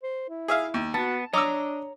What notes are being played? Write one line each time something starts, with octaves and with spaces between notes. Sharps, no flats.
C5
E4
G#4 E5 F5
D#2
B3 F#4 A5
D4 C#5 D#5 A#5 D6 E6